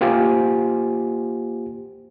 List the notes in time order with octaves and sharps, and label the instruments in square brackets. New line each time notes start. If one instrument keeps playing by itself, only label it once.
[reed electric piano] A#3 F4 G4 C5 G#5